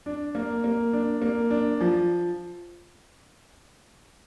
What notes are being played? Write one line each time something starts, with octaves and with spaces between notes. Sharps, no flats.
D4
A#3
A#3
D4
A#3
D4
F3